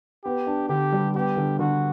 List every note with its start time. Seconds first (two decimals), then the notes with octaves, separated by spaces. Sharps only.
0.24 B3 G4
0.47 D4
0.69 D3 G4
0.92 G3
1.15 B3 G4
1.37 D3
1.59 D3 F#4